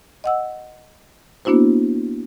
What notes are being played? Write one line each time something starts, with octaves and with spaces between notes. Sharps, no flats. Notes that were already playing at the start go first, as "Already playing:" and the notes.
D#5 F#5 E6
A#3 B3 D4 E4 F#4 C5